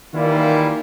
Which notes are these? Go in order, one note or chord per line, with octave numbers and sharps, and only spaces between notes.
D#3 E3 G3 A#3 E4 F4